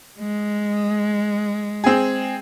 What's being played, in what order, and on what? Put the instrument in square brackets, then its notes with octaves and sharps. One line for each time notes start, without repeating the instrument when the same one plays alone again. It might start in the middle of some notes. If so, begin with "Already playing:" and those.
[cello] G#3
[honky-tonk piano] C4 G#4